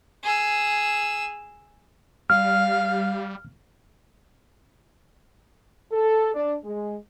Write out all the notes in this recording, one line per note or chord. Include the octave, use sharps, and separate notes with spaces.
G#4 E6
G3 F5 F6
A4
D4
G#3